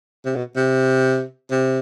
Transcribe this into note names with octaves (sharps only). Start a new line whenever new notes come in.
C3
B2
C3
C3